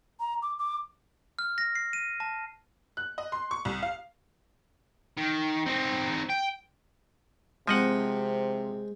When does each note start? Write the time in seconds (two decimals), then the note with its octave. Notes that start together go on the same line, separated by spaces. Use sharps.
0.20 A#5
0.42 D6
0.59 D6
1.39 F6
1.58 A#6
1.75 C7
1.93 D#7
2.20 A5
2.97 F#6
3.18 D#5
3.32 C6
3.51 C#6
3.65 C2
3.83 F5
5.17 D#3
5.66 C4 D#4
6.29 G5
7.67 C3 F3 G#3 C4 D#5 F#5